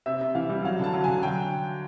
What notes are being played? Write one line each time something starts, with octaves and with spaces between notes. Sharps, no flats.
C3 E5
C3
E3 F5
G3
F#3 F5
D3 A5
F#3
D3 G#5
F#3 G5